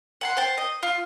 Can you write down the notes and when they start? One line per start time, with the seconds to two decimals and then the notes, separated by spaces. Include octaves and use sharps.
0.21 F#5 A5 C6
0.37 C5 G5 A5
0.58 D#5
0.83 F4